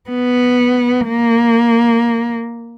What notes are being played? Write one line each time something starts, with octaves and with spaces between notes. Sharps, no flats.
B3
A#3